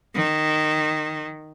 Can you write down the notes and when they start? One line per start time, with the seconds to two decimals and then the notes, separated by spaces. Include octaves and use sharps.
0.14 D#3